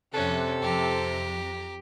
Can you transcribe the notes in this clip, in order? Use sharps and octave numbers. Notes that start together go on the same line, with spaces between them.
F2 C3 C#4 A4 F#6
F2 G4 A#5